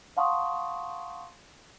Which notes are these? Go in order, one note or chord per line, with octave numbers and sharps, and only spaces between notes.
F5 F#5 A5 C6 C#6 D#6